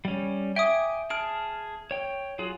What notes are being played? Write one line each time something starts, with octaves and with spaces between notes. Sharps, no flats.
G3 C#4
E5 G5 G#5 D6 D#6
G#4 A5 F6 D7
C#5 G5
F#3 F4 G#4